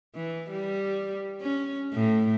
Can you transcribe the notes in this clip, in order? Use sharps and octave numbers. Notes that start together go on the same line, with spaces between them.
E3
G3
C#4
A2